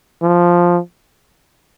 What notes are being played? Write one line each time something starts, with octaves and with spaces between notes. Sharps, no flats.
F3